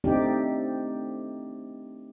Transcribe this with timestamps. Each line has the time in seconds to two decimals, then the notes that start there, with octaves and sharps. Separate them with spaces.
0.04 A3 C4 D4 D#4 G4 D5